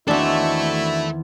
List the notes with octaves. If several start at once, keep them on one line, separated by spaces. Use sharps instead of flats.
E2 D#3 C4 D4 E4 F#4 A4 E5